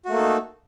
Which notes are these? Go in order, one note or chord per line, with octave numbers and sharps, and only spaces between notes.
A3 A#3 D#4 F#4 A4